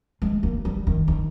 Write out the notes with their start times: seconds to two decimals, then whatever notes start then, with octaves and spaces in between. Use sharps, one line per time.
0.22 G#3
0.43 A#3
0.65 G3
0.87 D#3
1.08 D#3